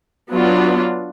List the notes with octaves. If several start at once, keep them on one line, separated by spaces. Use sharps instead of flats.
F#3 B3 D4 F4